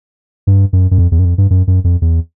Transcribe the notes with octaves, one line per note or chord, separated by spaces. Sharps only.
G2
F#2
F#2
F2
E2
F#2
F2
G2
F#2
F#2
F2
E2